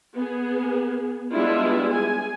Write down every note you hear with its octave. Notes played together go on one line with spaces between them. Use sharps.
B3 G#4
G3 G#3 B3 D4 E4 F4
G#4 G#5